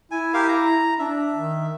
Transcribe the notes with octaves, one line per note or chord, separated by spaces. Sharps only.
E4 G#5
G4 A#4 F5
A#5
D4 E5
D#3